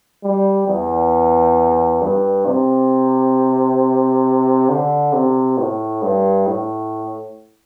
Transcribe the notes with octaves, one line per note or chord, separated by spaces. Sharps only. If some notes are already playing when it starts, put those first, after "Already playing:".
G3
E2
G2
C3
D3
C3
A2
G2
A2